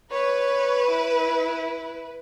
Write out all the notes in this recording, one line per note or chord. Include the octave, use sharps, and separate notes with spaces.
B4 C#5
E4